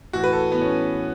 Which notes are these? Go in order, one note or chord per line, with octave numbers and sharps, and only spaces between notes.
A2 E3 F#4
B4
A4
A2 E3 B3
C#4